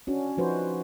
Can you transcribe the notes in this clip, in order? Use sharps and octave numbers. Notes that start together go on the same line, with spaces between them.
C#4 D4 F#4
F3 D#4 F#4 B4 C5